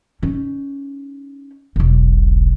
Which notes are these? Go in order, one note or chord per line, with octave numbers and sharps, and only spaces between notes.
C#4 D#4
E1 B1